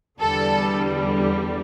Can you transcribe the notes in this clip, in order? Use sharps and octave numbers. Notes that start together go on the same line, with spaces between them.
E2 D3 G3 A4